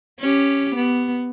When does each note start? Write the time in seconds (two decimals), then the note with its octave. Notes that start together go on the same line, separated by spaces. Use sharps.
0.19 C#4 G4
0.75 B3